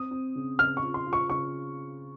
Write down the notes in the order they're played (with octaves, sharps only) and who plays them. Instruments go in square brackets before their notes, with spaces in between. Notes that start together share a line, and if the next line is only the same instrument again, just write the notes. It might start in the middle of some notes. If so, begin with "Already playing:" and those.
Already playing: [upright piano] C4 [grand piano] D#6
[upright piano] C4
C#3
[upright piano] C#3 [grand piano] F6
[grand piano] C#6
[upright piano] F4
[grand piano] C6
[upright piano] F4
[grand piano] C#6
[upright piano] C#3 [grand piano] C#6